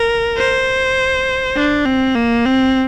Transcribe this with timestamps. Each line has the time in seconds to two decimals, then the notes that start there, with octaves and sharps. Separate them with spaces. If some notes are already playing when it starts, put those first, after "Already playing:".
Already playing: A#4
0.38 C5
1.57 D4
1.86 C4
2.15 A#3
2.46 C4